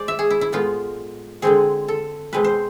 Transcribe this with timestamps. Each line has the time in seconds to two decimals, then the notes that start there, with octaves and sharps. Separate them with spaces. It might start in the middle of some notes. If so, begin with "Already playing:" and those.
Already playing: G#3 C5 D5
0.08 E5
0.19 G#4
0.30 E4
0.41 E4
0.52 A2 G#3 B3 F4
1.42 D3 G#3 C4 G#4
1.88 A4
2.33 B2 G#3 C4 B4
2.44 C5